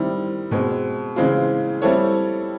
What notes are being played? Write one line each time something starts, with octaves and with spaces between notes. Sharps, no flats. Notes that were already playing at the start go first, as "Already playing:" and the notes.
Already playing: D#3 G3 C4 E4
B2 G#3 C4
C#3 E3 G#3 C4 F4
G3 C4 E4 A4 C#5